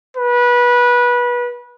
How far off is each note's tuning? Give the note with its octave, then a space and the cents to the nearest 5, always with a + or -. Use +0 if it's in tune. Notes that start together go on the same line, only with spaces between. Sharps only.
B4 -25